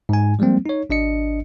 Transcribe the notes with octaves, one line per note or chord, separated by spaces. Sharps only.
G#2 G#5
F3 G3 G#3 A#3 C4
D#4 C#5
G#1 D4 D#5 C#7